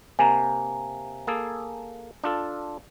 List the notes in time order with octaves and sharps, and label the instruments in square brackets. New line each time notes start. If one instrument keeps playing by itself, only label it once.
[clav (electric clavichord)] C3 A#3 [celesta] G#5 A#5
[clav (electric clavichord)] A#3 G#4 A4
D4 F4 A4